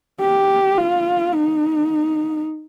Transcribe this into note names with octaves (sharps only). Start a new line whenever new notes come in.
G4
F4
D#4